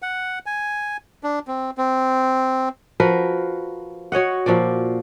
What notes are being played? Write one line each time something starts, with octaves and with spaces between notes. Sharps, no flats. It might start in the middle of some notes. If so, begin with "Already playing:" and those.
F#5
G#5
D4
C4
C4
F3 F#4 A#4 B4
F#4 C#5 D#5 F#5
A#2 F3 F#4 D5